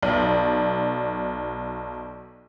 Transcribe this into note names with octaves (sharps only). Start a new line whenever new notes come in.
B1 D5